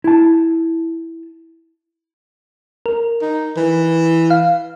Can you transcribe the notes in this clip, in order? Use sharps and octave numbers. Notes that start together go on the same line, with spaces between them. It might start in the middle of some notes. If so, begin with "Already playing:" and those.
E4 A5
A#4
D#4
E3
F5